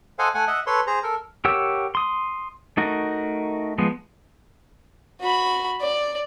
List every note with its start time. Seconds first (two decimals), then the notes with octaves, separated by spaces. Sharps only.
0.19 A4 C5 D#5 F5 F#5 G#5
0.34 A3 F#5 G#5
0.47 D#5 E5 F#5
0.67 A4 B4 C#5 C6
0.87 G#4 C5 A#5
1.03 A4 A#4
1.45 G4 A#4 C#5 F#5 E6
1.95 C6 D#6
2.77 A3 D#4 F#4 A#4
3.78 F3 G#3 B3
5.21 F#4 B5
5.81 D5